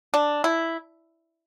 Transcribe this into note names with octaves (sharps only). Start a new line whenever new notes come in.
D4
E4